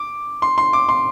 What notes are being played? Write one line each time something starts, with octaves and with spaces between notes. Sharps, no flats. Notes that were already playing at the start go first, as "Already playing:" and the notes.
Already playing: D6
C6
C6
D6
C6